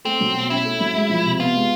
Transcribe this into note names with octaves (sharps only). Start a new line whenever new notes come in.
A3 C4
F#3
B2
C#4 E4
A3
F#3
G#3
F3
C3
B3 F4
G#3